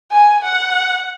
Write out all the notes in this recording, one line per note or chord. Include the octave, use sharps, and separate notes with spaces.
G#5
F#5